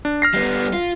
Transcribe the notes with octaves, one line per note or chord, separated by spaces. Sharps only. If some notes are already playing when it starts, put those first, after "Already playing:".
D4
F6 A#6 C7
G3 B3
F4